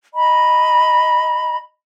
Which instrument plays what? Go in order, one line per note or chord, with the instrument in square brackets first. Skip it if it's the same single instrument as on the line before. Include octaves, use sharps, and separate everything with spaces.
[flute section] D#5 A#5 B5